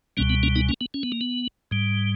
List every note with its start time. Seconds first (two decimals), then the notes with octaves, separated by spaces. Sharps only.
0.17 C#2 B2 G3 A#3 C#4
0.30 B3
0.43 A#3 C#4
0.56 B3 D#4
0.69 A#3 C#4
0.81 B3
0.94 C#4
1.03 B3
1.12 A#3
1.21 B3
1.71 G#2 G3